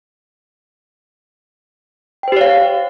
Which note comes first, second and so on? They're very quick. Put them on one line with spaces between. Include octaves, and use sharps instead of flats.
G5 C5 G4 C#5 F5